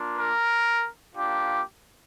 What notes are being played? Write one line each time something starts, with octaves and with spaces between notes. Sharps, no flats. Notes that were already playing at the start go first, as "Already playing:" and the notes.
Already playing: A#3 D4 F4
A#4
A#3 D4 F4 G4